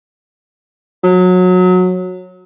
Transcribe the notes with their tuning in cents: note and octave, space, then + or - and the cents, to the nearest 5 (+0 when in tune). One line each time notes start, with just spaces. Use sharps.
F#3 -20